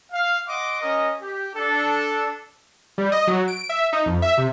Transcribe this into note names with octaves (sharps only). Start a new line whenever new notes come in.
F5
D#5 F#5 C6 D6
C#4 A#4 D#5
G4
D4 A4
G3
D#5
F#3
D7
E5
D#4
F2
E5
C3